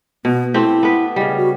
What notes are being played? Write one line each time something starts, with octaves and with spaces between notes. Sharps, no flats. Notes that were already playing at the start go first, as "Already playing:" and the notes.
B2 B3
A3 C4 E4 G4
B3 B4
C#3 G3 D#5
F#4